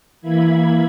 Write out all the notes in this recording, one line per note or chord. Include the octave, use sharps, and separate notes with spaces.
E3 A#3 E4 B5 G#6